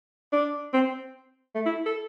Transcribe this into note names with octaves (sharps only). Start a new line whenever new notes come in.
D4
C4
A3
E4
A4